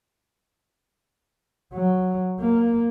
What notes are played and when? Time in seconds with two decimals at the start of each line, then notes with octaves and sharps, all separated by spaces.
1.73 F#3
2.40 A#3